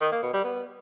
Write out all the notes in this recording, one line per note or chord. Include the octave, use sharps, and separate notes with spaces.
D#3
A#3
B2
G3
B3